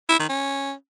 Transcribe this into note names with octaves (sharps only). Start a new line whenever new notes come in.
E4
D#3
C#4